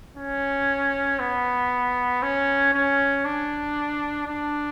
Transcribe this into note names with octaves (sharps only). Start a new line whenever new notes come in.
C#4
B3
C#4
C#4
D4
D4